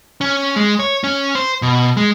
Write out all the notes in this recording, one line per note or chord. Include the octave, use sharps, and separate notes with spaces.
C#4
G#3
C#5
C#4
C5
B2
G#3